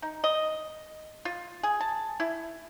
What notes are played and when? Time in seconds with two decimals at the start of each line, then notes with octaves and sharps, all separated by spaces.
0.02 D#4
0.24 D#5
1.25 F4
1.63 G#4
1.81 A5
2.20 E4